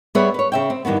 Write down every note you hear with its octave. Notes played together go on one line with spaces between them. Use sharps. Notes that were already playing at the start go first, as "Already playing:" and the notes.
G3 B3 G#4 B4 C#5 E5
B4 C#5
C#3 E5 G5
C4
G2 D#3 E3 B3